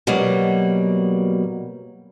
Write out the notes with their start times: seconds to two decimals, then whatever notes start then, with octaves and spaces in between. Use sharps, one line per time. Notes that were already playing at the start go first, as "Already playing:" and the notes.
0.07 B2 F#3 G3 A#3